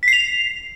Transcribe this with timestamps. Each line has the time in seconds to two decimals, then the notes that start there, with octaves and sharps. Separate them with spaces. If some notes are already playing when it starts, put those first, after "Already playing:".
0.03 B6
0.08 C7
0.13 F7